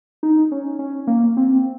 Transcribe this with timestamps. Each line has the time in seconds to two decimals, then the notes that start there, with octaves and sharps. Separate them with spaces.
0.23 D#4
0.52 C#4
0.79 C#4
1.07 A#3
1.37 C4